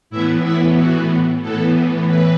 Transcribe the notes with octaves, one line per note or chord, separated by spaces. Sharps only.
A2 E3 B3 E4 E5
E4 E5
F#4
A2 E3 B3 A4
B4